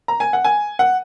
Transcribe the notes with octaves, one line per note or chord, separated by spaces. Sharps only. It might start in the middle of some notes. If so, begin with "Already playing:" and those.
A#5
G#5
F#5
G#5
F#5